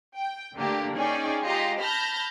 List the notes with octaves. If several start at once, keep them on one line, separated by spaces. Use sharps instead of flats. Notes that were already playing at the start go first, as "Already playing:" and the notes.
G5
D3 A3 A#3 D4 G4
C#4 D#4 G#4 D5 G5
G#3 F4 G4 D#5 A#5
A5 B5 F6 G6 A#6